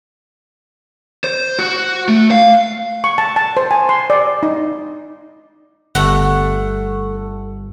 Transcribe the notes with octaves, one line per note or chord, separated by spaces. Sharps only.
C5
F#4
A3
F5
C#6
A5
A5
C5
G#5
C6
D5
D#4
G1 A3 F#5